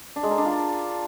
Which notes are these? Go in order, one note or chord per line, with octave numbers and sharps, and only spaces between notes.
D4
G#3
A#4
D4
F4